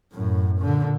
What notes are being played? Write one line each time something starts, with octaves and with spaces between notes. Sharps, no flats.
F#2 A2
A#2 D3